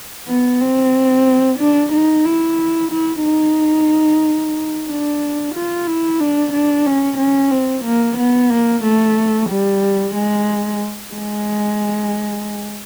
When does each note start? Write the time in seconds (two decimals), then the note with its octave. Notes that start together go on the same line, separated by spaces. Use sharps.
0.28 B3
0.61 C4
1.59 D4
1.93 D#4
2.25 E4
2.92 E4
3.24 D#4
4.89 D4
5.55 F4
5.87 E4
6.20 D4
6.53 D4
6.86 C#4
7.18 C#4
7.51 C4
7.85 A#3
8.18 B3
8.50 A#3
8.84 A3
9.50 G3
10.14 G#3
11.14 G#3